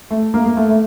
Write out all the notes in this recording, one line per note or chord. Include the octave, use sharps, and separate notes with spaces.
A3
A#3
A#3
A3
A3